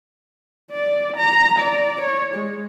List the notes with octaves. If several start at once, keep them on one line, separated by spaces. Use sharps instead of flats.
D5
A#5
D5
C#5
G#3